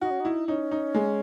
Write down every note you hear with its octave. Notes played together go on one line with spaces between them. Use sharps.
D#4 F#4
C#4
D#4 E4
C#4 D#4
D#4
G#3